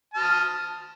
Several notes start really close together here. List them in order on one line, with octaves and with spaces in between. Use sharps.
A5 F6 D#6